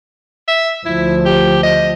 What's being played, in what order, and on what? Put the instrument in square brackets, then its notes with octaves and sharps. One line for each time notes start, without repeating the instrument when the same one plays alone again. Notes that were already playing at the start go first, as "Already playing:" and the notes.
[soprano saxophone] E5
[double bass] D2 F3 [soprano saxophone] E4
[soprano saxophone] G4
D#5